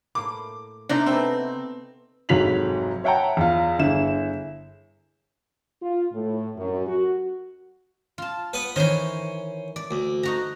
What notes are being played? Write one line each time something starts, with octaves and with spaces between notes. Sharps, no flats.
A2 A#3 D6
C3 D4 D#4 A#4 D5
B3 C4 A4 E5
F1 G#2 F#3 B6 F7 F#7
C#5 E5 F#5 G5 A5 A#5
E2 F4
G1 E4 G#4 E7
F4
A2
F#2
F#4
F4 A5
B3 B4
D#3 E3 C#4 C5
D5
D2
D#4 F#4 A#5